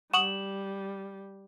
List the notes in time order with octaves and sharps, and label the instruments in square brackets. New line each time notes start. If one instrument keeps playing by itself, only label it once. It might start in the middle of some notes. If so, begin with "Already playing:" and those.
[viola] G3 [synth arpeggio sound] F#5 C#6 D#6 [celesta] E7 F#7